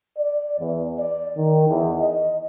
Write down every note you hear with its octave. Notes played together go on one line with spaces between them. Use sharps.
D5
E2
D5
D#3
E2
D#5